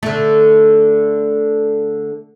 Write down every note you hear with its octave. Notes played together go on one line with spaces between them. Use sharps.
D3 A3